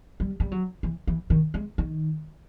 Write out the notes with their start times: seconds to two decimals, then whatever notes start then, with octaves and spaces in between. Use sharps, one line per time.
0.20 G3
0.40 G3
0.52 F#3
0.83 E3
1.07 E3
1.30 D#3
1.54 G#3
1.78 D#3